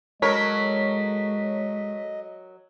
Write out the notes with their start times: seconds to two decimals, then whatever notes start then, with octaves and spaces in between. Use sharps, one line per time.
0.22 F#3 G#3 A4 A#4 C#5 D#5 B6